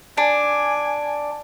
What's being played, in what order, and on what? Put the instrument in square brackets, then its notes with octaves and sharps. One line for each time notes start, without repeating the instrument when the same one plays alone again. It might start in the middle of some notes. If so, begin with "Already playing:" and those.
[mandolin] D4 [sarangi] G#5